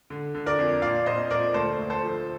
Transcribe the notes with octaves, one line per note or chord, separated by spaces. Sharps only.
D3
D3
A#4 D5
F2
A#2 D5 F5
A#2 C5 D#5
A#2 A#4 D5
D2 A4 C5
D2
A4 C5
F3